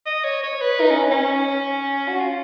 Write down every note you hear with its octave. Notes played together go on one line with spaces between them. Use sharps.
D#5
C#5
C#5
B4
D#4
C#4
C#4
F#4
F4